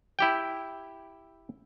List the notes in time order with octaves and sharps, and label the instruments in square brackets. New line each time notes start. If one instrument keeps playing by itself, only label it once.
[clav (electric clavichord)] E4 G4 G5